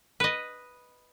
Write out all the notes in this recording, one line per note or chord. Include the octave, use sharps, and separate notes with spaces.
B4 D#5